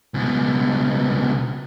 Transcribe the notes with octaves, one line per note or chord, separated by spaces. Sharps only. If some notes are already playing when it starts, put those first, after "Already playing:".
C#2 B2